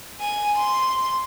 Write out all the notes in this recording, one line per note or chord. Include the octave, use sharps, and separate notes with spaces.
G#5
C6